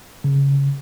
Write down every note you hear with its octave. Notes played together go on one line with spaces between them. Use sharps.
C#3